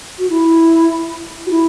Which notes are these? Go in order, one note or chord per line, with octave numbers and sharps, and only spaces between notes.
F#4
E4
F#4
E4